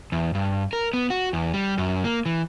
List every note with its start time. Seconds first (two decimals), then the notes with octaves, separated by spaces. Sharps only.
0.12 E2
0.35 G2
0.73 A#4
0.93 B3
1.10 F#4
1.33 E2
1.54 G3
1.78 F#2
2.04 A#3
2.26 E3